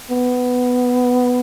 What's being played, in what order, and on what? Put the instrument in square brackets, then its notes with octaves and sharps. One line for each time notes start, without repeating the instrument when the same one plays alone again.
[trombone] B3